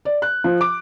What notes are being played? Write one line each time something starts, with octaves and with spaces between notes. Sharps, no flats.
D5
F#6
F3
D6